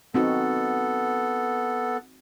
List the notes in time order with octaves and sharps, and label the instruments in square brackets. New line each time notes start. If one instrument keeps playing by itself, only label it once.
[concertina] B3 A4 [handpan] C4 D#4 F#4